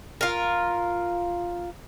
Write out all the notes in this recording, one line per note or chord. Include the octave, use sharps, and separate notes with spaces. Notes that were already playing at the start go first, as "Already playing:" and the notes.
F4 A#4